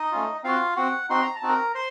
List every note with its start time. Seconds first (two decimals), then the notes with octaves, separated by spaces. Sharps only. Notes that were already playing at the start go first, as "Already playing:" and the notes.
Already playing: D#4 D#5
0.12 A3 C#4 F4
0.44 C4 F4 F#4 F5
0.76 C4 F#4 F#5
1.10 C4 D#4 F#4 C6
1.22 A#5
1.36 A5
1.43 C4 D#4 F#4
1.49 A#4 A#5
1.75 C5 C6